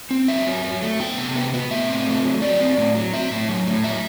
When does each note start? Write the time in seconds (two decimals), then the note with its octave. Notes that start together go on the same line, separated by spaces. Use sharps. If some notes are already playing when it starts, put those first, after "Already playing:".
0.11 C4
0.28 F#3 E5
0.47 F#3
0.64 F#3
0.82 A3
1.00 B3 G5
1.18 C3
1.35 B3
1.54 B3
1.71 A2 E5
1.89 C4
2.07 A3
2.24 F#3
2.41 F#3 D5
2.60 C4
2.77 A2
2.95 F#3
3.13 C4 E5
3.31 A2
3.49 F#3
3.67 A2
3.84 F#3 E5